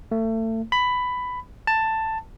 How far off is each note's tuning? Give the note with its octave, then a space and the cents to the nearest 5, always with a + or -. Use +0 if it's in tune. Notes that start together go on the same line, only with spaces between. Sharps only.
A3 +30
B5 +10
A5 +10